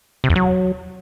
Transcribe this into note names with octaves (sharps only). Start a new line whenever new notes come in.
C3
E2
F#3